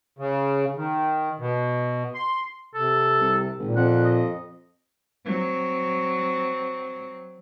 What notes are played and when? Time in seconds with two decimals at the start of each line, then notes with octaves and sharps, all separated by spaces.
0.19 C#3
0.77 D#3
1.39 B2
2.15 C6
2.75 C3 A4
3.20 C2
3.59 G#1 A#2
3.76 F2 F#5
4.04 D#5
5.25 F#3 C4